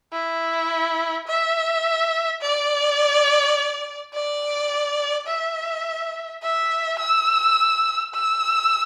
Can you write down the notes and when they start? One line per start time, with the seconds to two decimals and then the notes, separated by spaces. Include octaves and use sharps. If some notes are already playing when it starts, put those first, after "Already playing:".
0.13 E4
1.27 E5
2.42 D5
4.14 D5
5.27 E5
6.42 E5
6.99 E6
8.14 E6